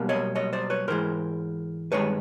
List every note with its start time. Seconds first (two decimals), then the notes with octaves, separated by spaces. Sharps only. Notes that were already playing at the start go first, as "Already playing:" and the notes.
Already playing: B1 B2 G3 A#3
0.09 C#5 D#5
0.36 C#5 D#5
0.53 C5 D5
0.70 B4 C#5
0.88 G#2 E3 G#3 A#4 C5
1.92 G2 D#3 G#3 B4 C#5